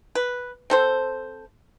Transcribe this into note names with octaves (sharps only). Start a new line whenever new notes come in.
B4
C4 A4 C5